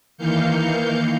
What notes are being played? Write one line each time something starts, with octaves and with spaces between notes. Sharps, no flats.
D#3 E3 A#3 F5 G6 C#7